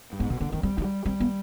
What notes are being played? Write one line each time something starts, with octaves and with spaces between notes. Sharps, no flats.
G2
G#2 B3
B2 D3
D3 B3
D#3 C4
G3 C4
F3 D#4
G3
G3 C4
B3